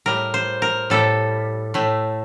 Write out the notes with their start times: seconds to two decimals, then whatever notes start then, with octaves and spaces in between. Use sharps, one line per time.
0.06 A2 G3 A#4
0.34 C5
0.62 A#4
0.90 A2 G3 A4
1.74 A2 A3